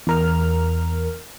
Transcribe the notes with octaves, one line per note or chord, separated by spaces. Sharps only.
E2 A#4 F6